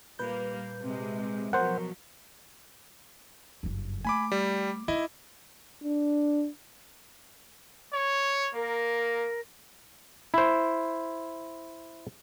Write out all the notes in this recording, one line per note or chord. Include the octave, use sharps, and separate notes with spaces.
A#2 G3 A#3 B4 G6
C3 G#3
B2 F3 F#3 A#4 C5 F#5
F#1 G2
A3 G#5 B5 D6
G3
D#4 E4 D#5
D4
C#5
A#3 A#4
E4 C5